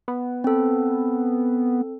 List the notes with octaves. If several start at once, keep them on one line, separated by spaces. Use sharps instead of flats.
B3
C4 A4